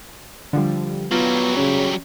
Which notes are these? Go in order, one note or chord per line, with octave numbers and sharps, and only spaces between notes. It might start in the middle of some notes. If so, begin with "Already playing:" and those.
D3 F3 G3
F#3 G3 B3 F4
C#3 C#4